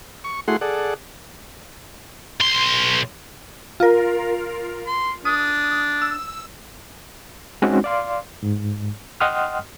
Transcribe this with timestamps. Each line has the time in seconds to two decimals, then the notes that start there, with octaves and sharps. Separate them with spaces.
0.24 C#6
0.48 A3 E4 F#4 G#4 F#5 C6
0.61 G#4 A4 D5 F#5
2.40 B1 C6
3.80 F4 A#4
4.87 C6
5.25 D4 D#6
6.02 E6
7.62 G#3 C4 C#4 D#4 F#4 G#4
7.84 D5 F5 C6
8.43 G#2
9.20 D#5 F#5 G5 C6 D#6 F6